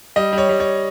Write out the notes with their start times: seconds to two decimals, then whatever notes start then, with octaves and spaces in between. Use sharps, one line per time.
0.16 G3 D#5
0.33 G3
0.38 C#5
0.49 G3
0.60 C#5